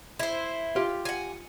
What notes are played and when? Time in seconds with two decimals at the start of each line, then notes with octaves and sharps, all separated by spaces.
0.19 E4 C5
0.76 F4 G4
1.05 F#5 G#5